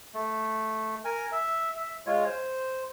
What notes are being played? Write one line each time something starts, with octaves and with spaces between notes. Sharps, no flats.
A3
A#4 G#5
E5
E5
G#3 F4 C#5
C5